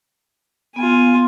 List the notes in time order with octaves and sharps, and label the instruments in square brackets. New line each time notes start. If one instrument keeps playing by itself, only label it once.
[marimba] B3 [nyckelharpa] F4 G#5